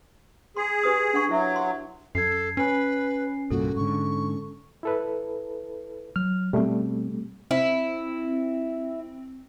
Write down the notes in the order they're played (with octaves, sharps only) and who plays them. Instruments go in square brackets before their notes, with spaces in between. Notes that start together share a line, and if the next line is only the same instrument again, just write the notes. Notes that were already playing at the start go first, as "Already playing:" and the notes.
[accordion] G#4 [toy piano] C6
[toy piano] G4 B4 D#6
D4 F#5 C#6
[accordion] F#3 [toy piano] E4 E5
[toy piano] F#4 C6
[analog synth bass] F#2 [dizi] A4 [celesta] G#6 C7
[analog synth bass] C#4 [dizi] B4 [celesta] G#5 C7
[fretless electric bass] C2 G2 A#2 [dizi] F#4 [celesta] A4
[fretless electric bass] G#2 D3 [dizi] C#6
[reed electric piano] E4 A4 B4
[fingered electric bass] F#3 [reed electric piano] F6
[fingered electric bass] B2 C4 [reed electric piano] G3 A3
[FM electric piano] C4 [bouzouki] E4